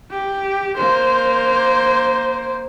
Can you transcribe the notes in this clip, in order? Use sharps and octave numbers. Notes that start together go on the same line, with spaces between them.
G4
A#3 C5